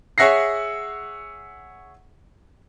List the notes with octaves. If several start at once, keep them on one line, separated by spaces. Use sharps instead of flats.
G#4 C#5 E5 F#5 A#6 C7